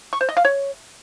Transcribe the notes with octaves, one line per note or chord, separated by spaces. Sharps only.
C#6
C5
D#5
F5
C#5